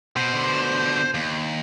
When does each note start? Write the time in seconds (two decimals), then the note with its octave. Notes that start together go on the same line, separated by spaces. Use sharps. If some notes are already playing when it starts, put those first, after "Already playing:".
0.16 B2 C5
0.34 B2 D3
1.14 D#2